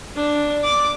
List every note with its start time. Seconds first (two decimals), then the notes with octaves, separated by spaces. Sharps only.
0.16 D4
0.64 D6